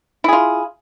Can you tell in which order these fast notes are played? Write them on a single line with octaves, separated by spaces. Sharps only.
E4 G#4 F4